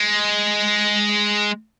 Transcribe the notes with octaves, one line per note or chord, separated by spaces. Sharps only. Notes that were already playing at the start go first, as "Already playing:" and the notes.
Already playing: G#3